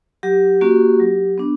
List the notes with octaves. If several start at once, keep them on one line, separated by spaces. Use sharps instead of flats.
F#3 G4
A#3 C#4 F#4
F#3
B3 D4